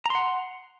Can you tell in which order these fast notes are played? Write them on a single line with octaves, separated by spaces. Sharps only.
A#5 C6 F#5